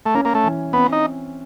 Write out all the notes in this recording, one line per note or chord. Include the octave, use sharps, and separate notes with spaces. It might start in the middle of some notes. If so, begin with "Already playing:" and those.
A3
A#3 C#4
A#3
A3
E3
B3 C4
D#4